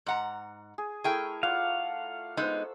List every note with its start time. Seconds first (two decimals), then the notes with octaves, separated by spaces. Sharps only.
0.06 G#2 F#5 A#5
0.78 G#4
1.04 A3 E4 G#4 A#4 G5
1.43 F4 D5 F5 F#5
2.37 G#3 B3 D#4 C5 E6